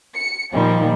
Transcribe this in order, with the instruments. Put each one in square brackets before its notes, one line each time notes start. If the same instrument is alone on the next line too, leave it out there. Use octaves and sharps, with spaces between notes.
[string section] C#7
A#2 D#3 F3 G3